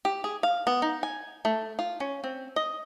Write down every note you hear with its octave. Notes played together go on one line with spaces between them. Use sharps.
G4
G#4
F5
B3
D#4
G#5
A3
F4
C#4
C4
D#5